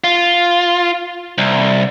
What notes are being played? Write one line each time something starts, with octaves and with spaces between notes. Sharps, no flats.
F4
C2